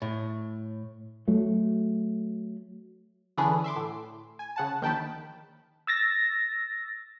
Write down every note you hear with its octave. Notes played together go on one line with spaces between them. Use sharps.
A2
F#3 A3
D3 E3 C#4 D4 G#4 B4
E5 C6 D6
A2
G#5
C#3 F#5 A5
A#1 D#3 G5 A5 B5
E6 A6 A#6